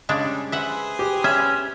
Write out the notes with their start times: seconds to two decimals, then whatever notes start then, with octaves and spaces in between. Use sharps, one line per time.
0.09 C#3 G3 G#3 D4
0.52 G#4 B4 C5 E5 F#5
0.99 G4
1.24 C#4 E5